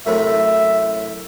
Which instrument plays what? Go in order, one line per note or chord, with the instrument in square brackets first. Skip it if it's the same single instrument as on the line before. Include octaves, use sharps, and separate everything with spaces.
[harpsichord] F#2 A2 C3 [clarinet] E5